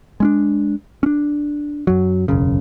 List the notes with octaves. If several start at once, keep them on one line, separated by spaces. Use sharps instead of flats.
G#3 C#4 D4
C#4 D4
F#2 F#3
E1 B1 F#2 C#3